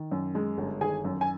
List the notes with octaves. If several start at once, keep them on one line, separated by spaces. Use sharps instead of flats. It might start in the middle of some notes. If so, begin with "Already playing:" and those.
Already playing: D#3
F#2
G#3
G1
D#3 G#4 G#5
F#2
G#5